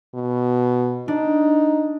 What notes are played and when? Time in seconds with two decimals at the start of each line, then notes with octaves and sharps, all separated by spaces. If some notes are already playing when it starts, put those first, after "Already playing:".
0.14 B2
1.08 D4 D#4